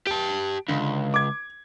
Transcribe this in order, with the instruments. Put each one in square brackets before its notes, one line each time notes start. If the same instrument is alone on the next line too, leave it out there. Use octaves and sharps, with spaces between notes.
[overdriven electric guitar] G4 A5 [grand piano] D7
[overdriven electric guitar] C#2 [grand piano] D3
[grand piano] D6 G#6